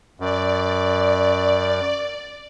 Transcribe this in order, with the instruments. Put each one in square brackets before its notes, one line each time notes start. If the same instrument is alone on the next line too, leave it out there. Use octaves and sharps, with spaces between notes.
[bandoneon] F#2 [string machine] D5